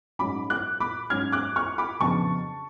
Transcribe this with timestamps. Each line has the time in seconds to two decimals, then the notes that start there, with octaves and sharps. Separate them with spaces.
0.19 G#2 F#3 C#4 B5 D6
0.50 D6 F#6
0.80 B5 D6
1.10 G#2 F#3 C#4 F6 G#6
1.32 D6 F#6
1.56 C#6 F6
1.78 B5 D6
2.00 F2 C#3 F#3 B3 D4 A5 C#6